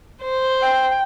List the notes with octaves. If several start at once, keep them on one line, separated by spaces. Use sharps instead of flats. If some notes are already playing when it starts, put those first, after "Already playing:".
C5
G5